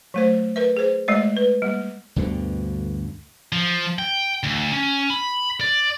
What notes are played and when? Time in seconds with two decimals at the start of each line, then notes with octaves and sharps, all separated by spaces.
0.14 F#3 A3 C5
0.56 A#4 B4 E5
0.77 G#4 C5
1.08 G#3 A3 D5
1.37 B4
1.62 G3 A#3
2.16 D2 G2 B2 D3
3.52 F3
3.99 G5
4.43 D2
4.72 C#4
5.10 B5
5.61 D5